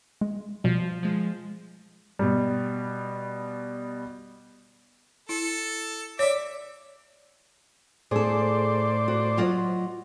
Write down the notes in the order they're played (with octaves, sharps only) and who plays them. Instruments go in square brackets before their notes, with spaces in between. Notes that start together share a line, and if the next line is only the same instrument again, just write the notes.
[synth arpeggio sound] G#3
[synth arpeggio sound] B2 G3 [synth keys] F3
[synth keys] F3 G#3
[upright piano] B2 G3
[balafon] E4 [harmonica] A4
[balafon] C#5 D5 [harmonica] E5 D6
[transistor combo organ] A2 C5 D5 [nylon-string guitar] G#4 A4
[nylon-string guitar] F#4
F#3 F4 D#5